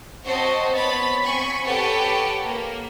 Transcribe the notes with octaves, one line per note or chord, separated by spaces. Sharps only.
C4 F#4 C5 C#5 D#5 A5
B3 C#5 B5 A6
C4 G#5 B5 C#6
G4 A4 B4 C#5 F#5 G5
A#3